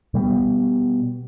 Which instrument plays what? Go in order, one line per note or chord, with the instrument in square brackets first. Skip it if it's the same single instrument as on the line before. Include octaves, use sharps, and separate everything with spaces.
[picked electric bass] B2 G3 A3 B3